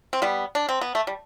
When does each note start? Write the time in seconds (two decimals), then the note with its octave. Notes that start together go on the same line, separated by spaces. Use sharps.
0.13 C4
0.22 G3 B3
0.55 D4
0.69 C4
0.81 B3
0.95 A3
1.07 G3